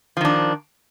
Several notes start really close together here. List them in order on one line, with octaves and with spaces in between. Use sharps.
F3 D#3 D4